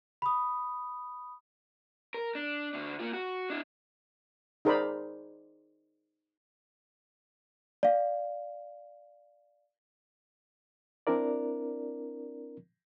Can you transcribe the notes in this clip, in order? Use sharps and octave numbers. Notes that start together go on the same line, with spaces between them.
B5 D#6
A#4
D4
D2 D4
A#3 F4
F#4
D4 E4
D#4 G#4 A#4 C5 D5 B5
D5 F5
C4 D4 E4 A#4 D5